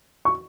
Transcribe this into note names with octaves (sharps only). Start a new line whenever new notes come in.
C#6